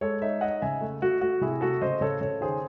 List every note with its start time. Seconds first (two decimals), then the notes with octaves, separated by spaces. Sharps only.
0.01 G#3 A4 C#5
0.22 D#4 C#5 E5
0.41 D#4 D#5 F#5
0.62 C#3 E5 G#5
0.81 A3
1.02 A3 F#4
1.21 A3 F#4
1.41 C3 E4 G#4
1.61 A3 F#4 A4
1.81 C#3 C5 D#5
2.01 C#3 A4 C#5
2.21 C#3 A4 C#5
2.41 D#3 G#4 C5